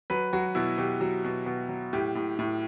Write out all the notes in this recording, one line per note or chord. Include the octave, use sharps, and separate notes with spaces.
F#3 B4
F#3 F#4
B2 E4
B2 G4
F#3 F#4
B2
B2
F#3
A2 G4
A2
A2